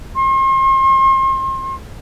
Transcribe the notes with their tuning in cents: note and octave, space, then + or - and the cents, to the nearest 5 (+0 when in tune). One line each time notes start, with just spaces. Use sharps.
C6 +40